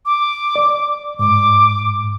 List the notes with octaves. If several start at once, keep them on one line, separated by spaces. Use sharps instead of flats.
D6
D5
G#2 D6